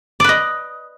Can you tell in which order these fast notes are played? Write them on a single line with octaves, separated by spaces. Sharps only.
D5 B4 D#5